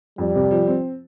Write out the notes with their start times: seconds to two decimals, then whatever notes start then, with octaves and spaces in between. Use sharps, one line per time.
0.18 F2 G3
0.35 C3
0.51 F3
0.67 C4